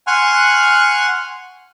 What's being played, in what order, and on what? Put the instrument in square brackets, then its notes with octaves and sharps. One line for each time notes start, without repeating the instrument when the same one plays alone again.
[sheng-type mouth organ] F#5 G#5 C6 C#6 F6 F#6